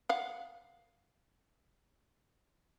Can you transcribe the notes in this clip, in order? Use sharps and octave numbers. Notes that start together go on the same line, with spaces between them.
F5 F#5